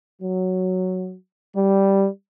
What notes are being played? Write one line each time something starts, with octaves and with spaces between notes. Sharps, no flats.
F#3
G3